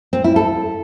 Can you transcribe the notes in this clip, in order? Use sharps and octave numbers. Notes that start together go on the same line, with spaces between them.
C4
E4
A4